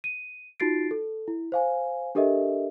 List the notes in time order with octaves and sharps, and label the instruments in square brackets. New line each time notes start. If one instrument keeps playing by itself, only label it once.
[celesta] D#7
D#4 F4 F#4 A6 C7 D7
A4
E4
C5 F5 G#5
D4 G4 A4 A#4 D#5 E5